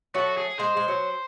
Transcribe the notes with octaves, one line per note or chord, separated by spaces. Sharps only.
F#3 A3 F#4
G#4
G#3 C5
G#3
F#3